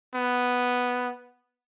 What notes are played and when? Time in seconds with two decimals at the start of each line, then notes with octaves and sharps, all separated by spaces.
0.15 B3